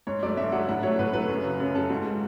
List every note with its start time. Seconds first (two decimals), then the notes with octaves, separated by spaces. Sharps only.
0.07 G#2 C#5
0.23 F#3 A3 D5
0.37 G#2 E5
0.52 F#3 A3 F#5
0.69 A2 F#5
0.83 F#3 A3 C#5
0.99 A2 B4
1.13 F#3 A3 B4
1.29 F#2
1.44 C#3 F#3
1.60 F#2
1.75 C#3 F#3 A4
1.90 G#2 F#4
2.05 G#3